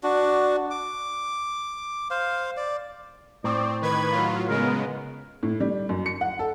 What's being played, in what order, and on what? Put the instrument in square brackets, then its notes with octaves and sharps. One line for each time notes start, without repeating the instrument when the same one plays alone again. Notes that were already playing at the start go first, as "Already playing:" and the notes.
[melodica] D4 F#4
D6
C5 F5
D5
[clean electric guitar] A2 [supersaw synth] C4 [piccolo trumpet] D5
[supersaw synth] D#3 B4 G#6 [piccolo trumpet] B5
[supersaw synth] F#3 F4
[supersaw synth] C#3 G#3 B3 [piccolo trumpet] A#4
[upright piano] A2
G3
F#2
C#7
F#5
A4